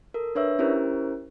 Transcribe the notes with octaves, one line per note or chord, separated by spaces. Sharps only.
A4 A#4
D4 B4 C#5 E5 E6
C#4 E4 G4 A#4 C5